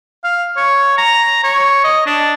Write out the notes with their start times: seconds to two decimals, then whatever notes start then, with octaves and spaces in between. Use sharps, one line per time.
0.24 F5
0.57 C#5
0.98 A#5
1.44 C#5
1.84 D#5
2.07 D4